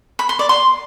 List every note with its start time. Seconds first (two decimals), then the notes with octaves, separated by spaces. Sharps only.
0.19 B5
0.29 C6
0.39 D5
0.49 C6